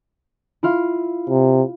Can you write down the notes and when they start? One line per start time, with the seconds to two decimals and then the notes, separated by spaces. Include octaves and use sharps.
0.63 E4 F4 F5
1.29 C3